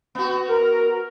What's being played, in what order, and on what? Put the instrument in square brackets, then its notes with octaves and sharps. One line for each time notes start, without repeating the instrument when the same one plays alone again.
[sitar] B3 F#4
[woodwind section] A#4